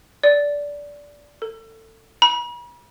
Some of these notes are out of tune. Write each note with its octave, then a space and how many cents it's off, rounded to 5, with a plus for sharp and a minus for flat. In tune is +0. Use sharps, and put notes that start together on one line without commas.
D5 -15
A4 +25
B5 -45